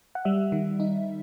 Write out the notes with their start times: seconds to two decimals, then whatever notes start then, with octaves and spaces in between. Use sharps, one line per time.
0.15 F#5
0.25 G3 E5
0.52 D#3
0.80 D#4